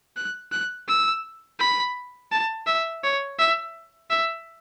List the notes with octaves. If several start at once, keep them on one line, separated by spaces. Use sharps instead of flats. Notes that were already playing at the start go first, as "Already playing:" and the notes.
F#6
F#6
E6
B5
A5
E5
C#5
E5
E5